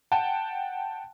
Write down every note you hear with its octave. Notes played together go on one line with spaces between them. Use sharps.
F#5 G5 A5